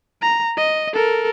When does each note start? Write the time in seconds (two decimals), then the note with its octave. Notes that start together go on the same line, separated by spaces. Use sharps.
0.22 A#5
0.57 D#5
0.93 A4 A#4